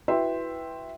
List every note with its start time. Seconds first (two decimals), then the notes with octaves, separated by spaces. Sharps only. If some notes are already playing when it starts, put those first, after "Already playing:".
0.08 E4 F#4 B4 E5 G5 C6